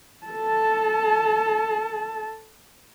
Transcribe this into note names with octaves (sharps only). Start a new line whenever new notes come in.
A4 A5